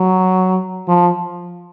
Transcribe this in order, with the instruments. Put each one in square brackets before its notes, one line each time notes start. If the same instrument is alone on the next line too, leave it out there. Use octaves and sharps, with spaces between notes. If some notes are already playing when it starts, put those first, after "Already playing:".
Already playing: [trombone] F#3
F3